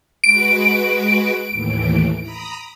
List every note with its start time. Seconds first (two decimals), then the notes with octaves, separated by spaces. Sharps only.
0.24 G#3 F#4 B4 D7
1.51 D#2 A2 E3
2.21 A#5 B5 D#6